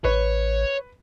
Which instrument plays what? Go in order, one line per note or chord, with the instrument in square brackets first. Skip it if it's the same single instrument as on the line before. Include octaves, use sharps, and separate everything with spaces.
[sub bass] A1 [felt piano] B4 [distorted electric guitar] C#5